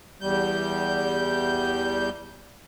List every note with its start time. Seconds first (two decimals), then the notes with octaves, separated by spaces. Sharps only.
0.21 E2 G3 G6